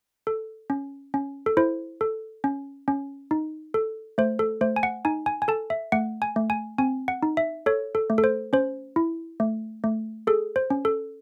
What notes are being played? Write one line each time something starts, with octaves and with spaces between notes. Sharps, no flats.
A4
C#4
C#4
A4
E4 C5
A4
C#4
C#4
D#4
A4
A3 C5
A4
A3 C5
G#5
F#5
D#4 G#5
G#5
G#5
A4 A5
E5
A3 F#5
G#5
A3
G#5
C4 G#5
F#5
D#4
E5
A4 C#5
A4
A3
A4
C5
C#4 C5
E4
A3
A3
G#4 A4
C5
C#4
A4